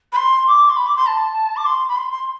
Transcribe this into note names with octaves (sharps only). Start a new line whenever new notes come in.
B5
C6
D6
C6
B5
D6
C6
A5
D6
C6
B5
C6
C6